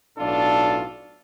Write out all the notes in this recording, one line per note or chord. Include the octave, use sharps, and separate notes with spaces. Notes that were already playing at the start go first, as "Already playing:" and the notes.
B1 A2 D4 F4 A4